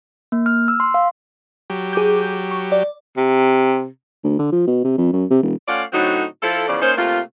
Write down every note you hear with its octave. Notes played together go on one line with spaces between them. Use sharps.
A#3
F6
E6
C6
F5
F#3 G4
G#4 D6 G6
C#6
D5
C3
D2
D3
F3
B2
C3
F2
F#2
C3
E1
A3 C#4 F4 D5 F5 F#5
A2 D3 F#3 C4 D#4 F#4
F3 E4 F4 A4
E2 C#3 F3 D5
A#3 C#4 D#4 C5
C3 A3 A#3 F4